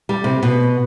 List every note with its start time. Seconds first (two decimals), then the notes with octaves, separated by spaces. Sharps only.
0.09 G3
0.24 C3
0.43 B2